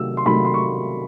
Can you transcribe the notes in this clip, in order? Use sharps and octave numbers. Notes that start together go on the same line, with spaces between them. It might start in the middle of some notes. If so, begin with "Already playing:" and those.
Already playing: C3 D#3 F#3 A3 E6
C6
C3 D#3 F#3 A3 B5
C6
C#6